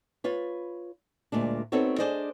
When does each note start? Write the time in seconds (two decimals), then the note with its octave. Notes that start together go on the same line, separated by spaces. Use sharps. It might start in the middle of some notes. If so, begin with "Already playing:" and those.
0.24 F4 B4 C#5
1.32 D2 A#2 G#3 D4
1.72 B3 C4 D#4 F#4 A4 C#5
1.98 D4 G#4 C5 D5 D#5